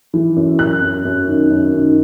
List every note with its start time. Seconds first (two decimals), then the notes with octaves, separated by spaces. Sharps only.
0.14 E3
0.36 F#2
0.59 F#2 F#6
0.82 F#2
1.05 F#2
1.28 D#3
1.50 F#2
1.73 D#3